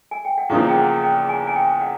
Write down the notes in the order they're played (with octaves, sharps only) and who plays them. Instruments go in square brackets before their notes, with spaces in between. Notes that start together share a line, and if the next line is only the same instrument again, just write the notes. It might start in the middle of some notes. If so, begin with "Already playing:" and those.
[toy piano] G#5
G5
F#5
[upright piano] E2 C#3 F3 A#3 [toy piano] F5
[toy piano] G5
F#5
G5
G#5
G#5
G5
F#5